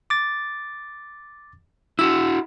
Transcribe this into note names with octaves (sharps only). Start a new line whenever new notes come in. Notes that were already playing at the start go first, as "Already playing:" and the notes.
D6 A6
E4 F#4 E6